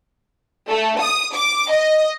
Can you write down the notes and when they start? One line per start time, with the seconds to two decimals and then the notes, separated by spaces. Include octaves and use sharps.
0.70 A3
1.00 D#6
1.34 D6
1.71 D#5